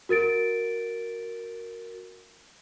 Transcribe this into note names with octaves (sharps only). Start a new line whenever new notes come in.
F#4 A#4 A6 D7